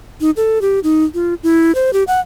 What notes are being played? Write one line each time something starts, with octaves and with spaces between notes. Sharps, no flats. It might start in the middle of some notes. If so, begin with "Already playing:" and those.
D#4
A4
G4
D#4
F4
E4
C5
G4
F#5